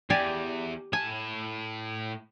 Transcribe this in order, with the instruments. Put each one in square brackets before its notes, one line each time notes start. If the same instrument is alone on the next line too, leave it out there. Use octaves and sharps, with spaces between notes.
[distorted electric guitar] E2 [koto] G4 D5 G#5
[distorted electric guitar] A2 A5 [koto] G#5